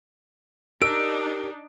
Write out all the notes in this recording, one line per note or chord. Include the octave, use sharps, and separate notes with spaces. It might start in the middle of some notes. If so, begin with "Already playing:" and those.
D4 D#4 G4 A#4 E6 D7